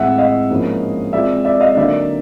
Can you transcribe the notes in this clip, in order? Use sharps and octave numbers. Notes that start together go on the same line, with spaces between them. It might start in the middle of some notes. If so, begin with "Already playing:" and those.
Already playing: A2 E3 G#3 C4 E5 F#5
D#5 F5
G#2 F3 A#3 C#4 E4
E3 G#3 C4 F4 D5 E5
D5 E5
D#5 F5
D3 F#3 A#3 D#4 D5 E5